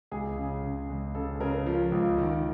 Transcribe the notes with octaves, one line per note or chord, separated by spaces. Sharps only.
C#2 G#4
C#3
C#3
C#2
C#3 A4
C#3 A#4
F3
C#2
D#3